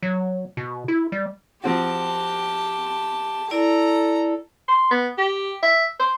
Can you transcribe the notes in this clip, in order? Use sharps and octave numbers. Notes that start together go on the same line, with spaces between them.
F#3
B2
E4
G3
F3 C4 F#4 G4 A5
E4 A4 D5 A#5
C6
B3
G4
E5
C5